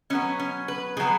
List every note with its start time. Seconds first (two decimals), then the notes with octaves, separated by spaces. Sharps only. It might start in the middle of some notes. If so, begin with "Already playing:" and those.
0.10 B2 F#3 B3 C#4
0.39 C#4
0.68 B4
0.97 B2 F#3 B3 G#4